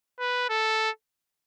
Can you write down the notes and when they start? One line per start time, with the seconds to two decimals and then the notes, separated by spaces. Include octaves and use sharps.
0.19 B4
0.50 A4